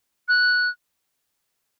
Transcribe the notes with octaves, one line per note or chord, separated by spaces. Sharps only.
F#6